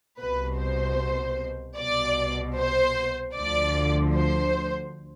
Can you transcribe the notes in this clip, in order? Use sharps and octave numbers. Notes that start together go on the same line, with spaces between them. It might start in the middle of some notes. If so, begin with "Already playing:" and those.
C2 B2 B4
C5
C2 B2 D5
C5
D2 D3 F3 D5
C5